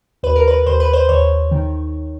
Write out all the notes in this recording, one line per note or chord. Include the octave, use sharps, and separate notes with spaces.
D#2 B4
A#4
B4
D#2 C5
B4
C5
D#2 C#5
D#3